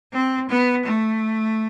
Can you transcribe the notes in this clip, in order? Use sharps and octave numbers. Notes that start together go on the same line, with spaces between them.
C4
B3
A3